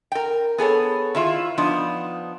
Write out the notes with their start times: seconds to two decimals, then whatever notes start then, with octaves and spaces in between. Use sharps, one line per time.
0.12 A#4 G5
0.58 B3 G#4 A4 C#5
1.15 D#3 E4 F4
1.58 F3 B3 D4 D#4